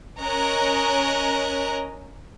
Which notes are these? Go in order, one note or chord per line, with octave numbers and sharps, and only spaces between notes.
C#4 A#4 C#5 D#5 A#5 F#6